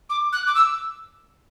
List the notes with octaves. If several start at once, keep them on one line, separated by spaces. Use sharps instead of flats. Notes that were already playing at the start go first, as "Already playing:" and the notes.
D6
F#6
D6
E6